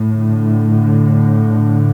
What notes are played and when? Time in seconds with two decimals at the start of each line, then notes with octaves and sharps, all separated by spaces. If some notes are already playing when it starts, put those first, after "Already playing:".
Already playing: A2
0.13 D3